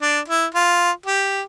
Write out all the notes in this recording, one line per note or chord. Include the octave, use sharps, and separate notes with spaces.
D4
E4
F4
G4